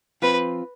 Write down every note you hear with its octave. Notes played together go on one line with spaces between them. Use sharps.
F3 C4 F4 B4